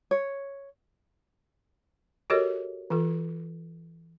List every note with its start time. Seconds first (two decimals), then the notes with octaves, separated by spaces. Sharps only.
0.11 C#5
2.30 F#4 G4 A4 A#4 C#5 D#5
2.90 E3 F4 A4